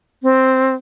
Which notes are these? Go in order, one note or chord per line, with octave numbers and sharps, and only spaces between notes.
C4